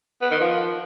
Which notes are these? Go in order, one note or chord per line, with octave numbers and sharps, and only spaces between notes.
B3
D#3
F3